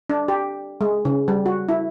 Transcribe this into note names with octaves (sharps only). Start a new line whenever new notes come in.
D4
G4
G#3
C#3
G3
F#4
E4